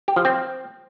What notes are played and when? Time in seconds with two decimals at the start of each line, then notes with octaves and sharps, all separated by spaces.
0.08 G4
0.16 F3
0.25 C4